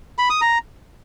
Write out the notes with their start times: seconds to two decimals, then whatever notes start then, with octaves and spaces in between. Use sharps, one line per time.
0.18 B5
0.30 D#6
0.41 A#5